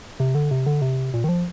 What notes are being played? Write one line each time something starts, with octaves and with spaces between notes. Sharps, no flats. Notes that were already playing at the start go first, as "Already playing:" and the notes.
C3
D3
C3
D3
C3
A#2
D#3
F3